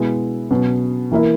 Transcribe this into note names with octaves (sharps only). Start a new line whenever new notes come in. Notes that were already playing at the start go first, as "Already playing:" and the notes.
Already playing: B2 G#3 B3 E4
B2 F#3 C#4
E3 A#3 E4 A#4